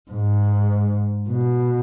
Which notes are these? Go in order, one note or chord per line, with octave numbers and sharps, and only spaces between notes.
G#2
B2